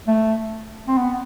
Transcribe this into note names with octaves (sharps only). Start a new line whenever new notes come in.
A3
C4
B3